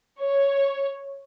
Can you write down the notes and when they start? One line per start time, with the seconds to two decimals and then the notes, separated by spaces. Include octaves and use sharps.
0.20 C#5